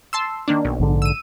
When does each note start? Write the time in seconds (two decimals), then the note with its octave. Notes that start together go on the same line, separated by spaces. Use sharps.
0.13 A5 C6 E6
0.48 D#3 A#3 D4
0.65 B1
0.79 A#1 G#2 D3
1.02 E6 D#7